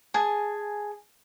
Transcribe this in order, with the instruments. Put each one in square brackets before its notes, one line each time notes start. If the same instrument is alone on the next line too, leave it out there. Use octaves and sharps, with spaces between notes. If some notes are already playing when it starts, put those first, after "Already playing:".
[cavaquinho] G#4 G#5 A5